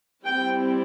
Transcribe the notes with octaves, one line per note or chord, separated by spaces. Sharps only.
G3 C4 E4 G5